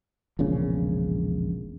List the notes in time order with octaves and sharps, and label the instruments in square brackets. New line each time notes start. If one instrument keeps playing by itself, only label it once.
[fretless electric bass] E1 A#1 C#3